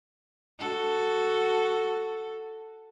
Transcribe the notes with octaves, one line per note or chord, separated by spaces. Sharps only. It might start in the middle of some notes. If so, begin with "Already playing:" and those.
F#4 A4